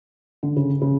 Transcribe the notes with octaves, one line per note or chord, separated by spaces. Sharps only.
D3
C#3
C#3